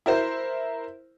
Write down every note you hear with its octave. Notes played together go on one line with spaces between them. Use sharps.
E4 A#4 C5